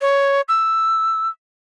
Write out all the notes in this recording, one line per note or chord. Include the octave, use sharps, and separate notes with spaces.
C#5
E6